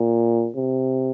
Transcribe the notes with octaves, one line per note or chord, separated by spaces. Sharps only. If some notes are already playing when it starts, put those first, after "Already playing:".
Already playing: A#2
C3